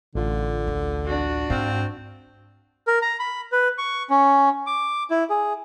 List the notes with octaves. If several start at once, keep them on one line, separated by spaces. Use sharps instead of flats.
A1 D3 F4
D2
D4 F#4
G#2 C4 F5
A#4
A#5
B5
B4
C#6
C#4
D6
E4
G#4